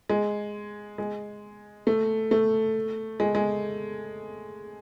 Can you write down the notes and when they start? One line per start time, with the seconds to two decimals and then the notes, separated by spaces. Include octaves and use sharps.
0.09 G#3
0.98 G#3
1.87 A3
2.31 A3
3.20 G#3
3.35 G#3